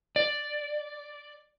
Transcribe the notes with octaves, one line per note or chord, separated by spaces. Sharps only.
D5